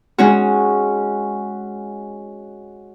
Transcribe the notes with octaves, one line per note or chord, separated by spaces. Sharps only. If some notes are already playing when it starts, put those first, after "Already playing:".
G#3 C#4 F#4